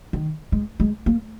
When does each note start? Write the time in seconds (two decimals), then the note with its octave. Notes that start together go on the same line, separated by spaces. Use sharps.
0.13 D#3
0.52 G#3
0.80 G#3
1.06 A#3